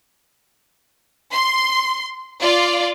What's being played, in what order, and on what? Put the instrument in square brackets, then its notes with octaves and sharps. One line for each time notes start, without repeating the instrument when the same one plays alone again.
[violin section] C6
F4 D5